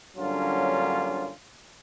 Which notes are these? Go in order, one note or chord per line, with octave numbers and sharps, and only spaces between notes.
G2 D3 F#3 A#3 C#4 F4